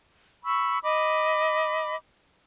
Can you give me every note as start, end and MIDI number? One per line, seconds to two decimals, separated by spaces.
0.44 0.78 83
0.44 0.78 85
0.44 0.78 88
0.83 1.95 75
0.83 1.95 83
0.83 1.95 86